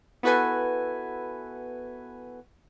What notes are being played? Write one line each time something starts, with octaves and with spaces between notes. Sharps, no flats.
B3 E4 F#4 A4 B4 G#5